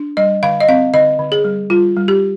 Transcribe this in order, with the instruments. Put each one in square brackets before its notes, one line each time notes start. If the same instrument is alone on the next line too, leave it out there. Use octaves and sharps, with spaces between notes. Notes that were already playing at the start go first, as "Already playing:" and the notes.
Already playing: [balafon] D4
G3 D#5
D3 F5
D#5
C4 F5
D3 D#5
D3
G#4
G3
G3 F4
G3
G4